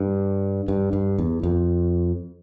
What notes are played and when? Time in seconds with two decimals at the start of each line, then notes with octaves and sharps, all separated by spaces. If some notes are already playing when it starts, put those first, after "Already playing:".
Already playing: G2
0.68 G2
0.93 G2
1.18 E2
1.43 F2